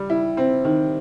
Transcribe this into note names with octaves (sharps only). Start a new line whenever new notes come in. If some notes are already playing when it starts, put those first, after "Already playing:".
Already playing: G3
E4
C4
D#3